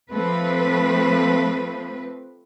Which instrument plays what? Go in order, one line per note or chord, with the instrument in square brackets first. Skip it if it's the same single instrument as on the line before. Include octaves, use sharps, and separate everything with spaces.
[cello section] F3 A3 C4 B4